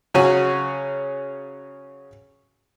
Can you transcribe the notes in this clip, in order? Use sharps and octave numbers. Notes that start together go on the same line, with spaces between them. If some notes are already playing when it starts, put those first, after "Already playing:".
C#3 F#3 C#4 F#4 G#5